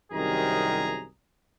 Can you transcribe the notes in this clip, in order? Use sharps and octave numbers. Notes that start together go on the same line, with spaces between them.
C2 F#2 C3 D#3 G#4 A#5